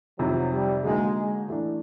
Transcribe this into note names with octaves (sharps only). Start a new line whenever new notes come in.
F2 C3 D#3 F#3
G3
D3 F#3 G#3 A#3 D#4
G#3
E3 A3 D4